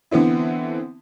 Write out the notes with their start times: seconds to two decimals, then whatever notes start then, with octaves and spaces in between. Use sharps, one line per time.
0.11 D3 E3 B3 C4 E4